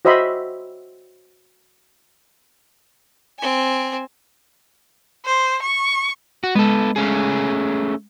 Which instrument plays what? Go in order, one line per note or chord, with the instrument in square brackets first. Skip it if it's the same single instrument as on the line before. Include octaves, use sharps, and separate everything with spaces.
[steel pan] F#4 C5 D#5 E5 B5 C6
[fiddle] C4 G#5
[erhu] C5
C#6
[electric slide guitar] F#4
[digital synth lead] G#3 [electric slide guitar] B3 A4
[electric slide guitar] A3 C#4 G#4